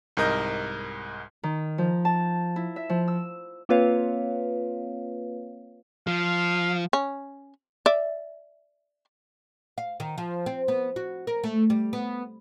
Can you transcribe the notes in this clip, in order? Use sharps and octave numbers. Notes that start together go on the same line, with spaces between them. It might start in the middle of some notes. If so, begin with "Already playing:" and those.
C2 G#2 A#4 D#5 G6
D#3
F3
A5
E4
E5
F3
E6
A#3 C4 F4 B4 C#5 F5
F3 F5
C#4
D5 E5
F5
D#3
F3
C4
B3
F#4
A#4
A3
G3
B3